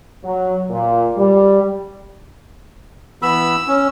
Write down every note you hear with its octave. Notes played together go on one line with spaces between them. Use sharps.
F#3
A#2
G3
E3 B3 B5 E6
C#4